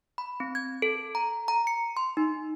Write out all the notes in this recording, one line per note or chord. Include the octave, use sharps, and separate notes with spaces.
B5
C4
G#6
A4
A#5
A#5
C#7
C6
D#4